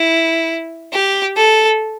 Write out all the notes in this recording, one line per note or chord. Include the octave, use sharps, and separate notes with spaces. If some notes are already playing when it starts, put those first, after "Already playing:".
Already playing: E4
G4
A4